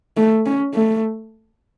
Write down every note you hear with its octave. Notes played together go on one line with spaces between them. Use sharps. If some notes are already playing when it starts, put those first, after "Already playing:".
A3
C#4
A3